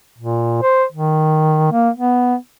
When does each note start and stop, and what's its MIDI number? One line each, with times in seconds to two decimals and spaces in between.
0.18 0.59 46
0.62 0.84 72
0.92 1.72 51
1.72 1.90 58
1.96 2.36 59